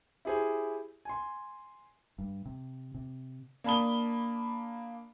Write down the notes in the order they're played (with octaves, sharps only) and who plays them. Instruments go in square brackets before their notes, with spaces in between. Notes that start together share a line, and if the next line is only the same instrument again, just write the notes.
[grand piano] E4 G4 G#4 C5
G#5 C6
[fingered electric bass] G2
C3
C3
[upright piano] A#3 D4 A5 B5 D#6 G7